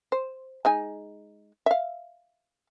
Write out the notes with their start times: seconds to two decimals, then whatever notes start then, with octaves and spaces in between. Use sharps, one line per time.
0.12 C5
0.65 G#3 D#4 G#5
1.66 E5 F5